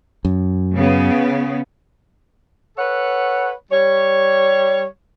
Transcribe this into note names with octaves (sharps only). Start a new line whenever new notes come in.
F#2
C#3 B3
A4 B4 C#5 F#5
G3 C#5